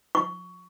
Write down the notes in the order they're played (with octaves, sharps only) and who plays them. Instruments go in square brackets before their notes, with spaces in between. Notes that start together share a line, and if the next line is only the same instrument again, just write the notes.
[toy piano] C#6